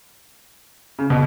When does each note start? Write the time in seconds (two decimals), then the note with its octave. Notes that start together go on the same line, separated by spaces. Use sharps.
0.99 C#3
1.10 B2